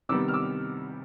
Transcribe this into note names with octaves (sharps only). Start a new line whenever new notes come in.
C3 D#3 G3 B3 D6 E6
F6
D6 E6